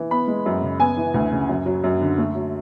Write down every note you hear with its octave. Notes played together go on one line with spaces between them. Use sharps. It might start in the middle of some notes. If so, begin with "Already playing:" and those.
Already playing: E3
B3 B5
G#3
F#2
C#3
B3 G#5
E3
D2
C#3
F#2
F#3
F#2
D3
A3
F#3